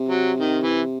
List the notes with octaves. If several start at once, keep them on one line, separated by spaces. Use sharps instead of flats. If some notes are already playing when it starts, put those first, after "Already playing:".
Already playing: C3
F#3
D#3
E3